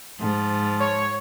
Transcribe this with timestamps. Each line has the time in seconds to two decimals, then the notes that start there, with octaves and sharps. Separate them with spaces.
0.19 G#2 F3
0.81 C#5